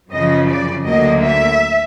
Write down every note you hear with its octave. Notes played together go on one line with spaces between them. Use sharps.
F#2 C#3 F3 D#5
D5
D2 D3 F#3 A#3 D#5
E5